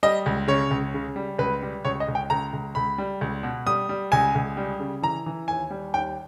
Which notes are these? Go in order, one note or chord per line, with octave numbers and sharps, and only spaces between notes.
G3 D#5
C#2
C#3 C#5
C#2
C#3
G3
C#2 B4
G3
C#2 C#5
D#5
C#2
G5
C#2 A#5
C#2
C#2 B5
G3
C#2
B2
G3 D#6
G3
C#2 G#5
C#2
G3
C#3
E3 A#5
E3
D#2 G#5
G3
D#2 G5